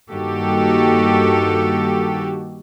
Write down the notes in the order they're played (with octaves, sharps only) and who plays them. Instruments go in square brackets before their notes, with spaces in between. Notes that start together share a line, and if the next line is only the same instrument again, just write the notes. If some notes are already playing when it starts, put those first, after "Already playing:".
[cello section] G2 D#3 A#3 F#4 G4 A4